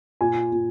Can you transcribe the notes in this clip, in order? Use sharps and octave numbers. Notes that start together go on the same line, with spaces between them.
A#2 G#5
A#2